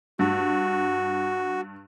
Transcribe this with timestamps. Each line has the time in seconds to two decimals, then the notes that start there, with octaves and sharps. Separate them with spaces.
0.19 G2 F#4